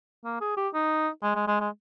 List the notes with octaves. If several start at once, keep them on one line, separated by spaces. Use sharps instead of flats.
A#3
G#4
G4
D#4
G#3
G#3
G#3
G#3